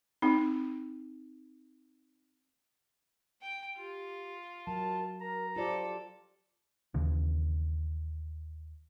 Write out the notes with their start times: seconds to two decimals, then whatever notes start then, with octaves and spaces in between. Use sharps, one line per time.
0.22 C4 D#4
3.42 G5
3.77 F4 G4
4.67 F#3 A#4 A5
5.21 A#4 A#5
5.56 F4 G4 A4 C5 D5
6.94 D#2 C#3 E3